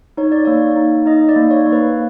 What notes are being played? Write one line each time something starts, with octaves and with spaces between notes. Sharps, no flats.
D#4 C#5
D5
A#3 C#5
D#4
D#4 D#5
D5
A#3
C#5
A#3
B4